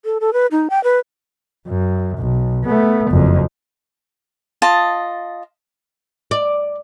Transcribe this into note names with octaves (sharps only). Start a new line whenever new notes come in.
A4
A4
B4
D#4
G5
B4
F#2
B1
A3 B3
F#1 F2
F4 D#5 A5
D5